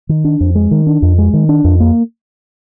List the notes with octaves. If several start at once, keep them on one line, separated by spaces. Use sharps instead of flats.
D#3
D4
F2
G#3
D#3
D4
F2
G#3
D#3
D4
F2
A#3